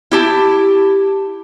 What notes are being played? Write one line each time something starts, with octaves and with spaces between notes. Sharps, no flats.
E4 G4 A5